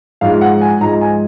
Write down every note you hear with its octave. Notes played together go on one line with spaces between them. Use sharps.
G#2 F3 G#3 F5
F#5
G#5
G#2 F3 G#3 A#5
G#5